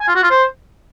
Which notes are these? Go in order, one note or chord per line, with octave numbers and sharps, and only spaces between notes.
G#5
F4
F#4
F4
C5